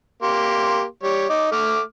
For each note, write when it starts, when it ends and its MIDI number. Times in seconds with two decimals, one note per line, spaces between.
0.23 0.83 58
0.23 0.83 67
0.23 0.83 84
1.03 1.27 55
1.03 1.27 73
1.29 1.47 63
1.29 1.47 86
1.52 1.81 57
1.52 1.81 86
1.52 1.81 89